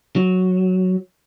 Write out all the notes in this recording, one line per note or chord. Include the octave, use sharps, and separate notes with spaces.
F#3